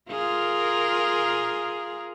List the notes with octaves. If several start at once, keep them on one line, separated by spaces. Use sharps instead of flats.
F4 G#4 A#4